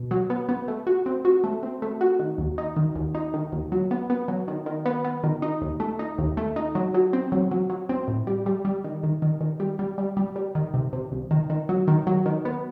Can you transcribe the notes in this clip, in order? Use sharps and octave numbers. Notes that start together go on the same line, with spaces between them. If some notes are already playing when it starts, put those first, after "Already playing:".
Already playing: B2
F#3
B3
B3
A3
F#4
C4
F#4
A3
C4
A3
F#4
D#3
D#2
D#4
D#3
D#2
D#4
D#3
D#2
F#3
B3
B3
F#3
D#3
D#3
B3
B3
D#3
D#4
D#2
A3
D#4
D#2
A3
D#4
F#3
F#3
C4
F#3
F#3
F#3
C4
A2
G3
G3
G3
D#3
D#3
D#3
D#3
G3
G3
G3
G3
G3
D#3
C3
C3
C2
D#3
D#3
F#3
D#3
F#3
D#3
B3